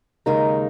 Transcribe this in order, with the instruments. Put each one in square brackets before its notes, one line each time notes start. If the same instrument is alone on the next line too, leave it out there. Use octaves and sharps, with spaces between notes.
[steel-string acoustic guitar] D#2 C#3 G#3 D#4 A#4